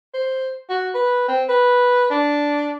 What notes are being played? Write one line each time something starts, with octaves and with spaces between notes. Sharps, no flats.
C5
F#4
B4
C4
B4
D4